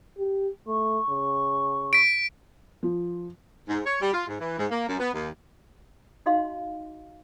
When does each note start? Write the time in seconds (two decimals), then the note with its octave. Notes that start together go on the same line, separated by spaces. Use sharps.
0.19 G4
0.67 A3 C#6
1.10 C#3
1.93 B6 D7
2.83 F3
3.69 G#2
3.86 C#5
4.01 G3
4.14 F4
4.27 G#2
4.40 E3
4.59 G#2
4.71 A#3
4.88 F#2
5.00 B3
5.14 D#2
6.26 D#4 F#4 D#5 F5 C6